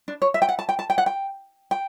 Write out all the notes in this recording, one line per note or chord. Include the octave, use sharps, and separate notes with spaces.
D4
C#5
E5
G5
F#5
A5
G5
A5
G5
F#5
G5
G5